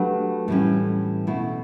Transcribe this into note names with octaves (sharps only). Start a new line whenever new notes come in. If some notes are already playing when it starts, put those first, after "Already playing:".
Already playing: F#3 A3 D4 G4 B4
A2 E3 G3 C#4
B2 A3 E4